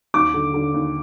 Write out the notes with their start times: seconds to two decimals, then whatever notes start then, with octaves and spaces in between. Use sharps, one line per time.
0.14 D#2 D6
0.34 D3
0.54 D3
0.74 D#2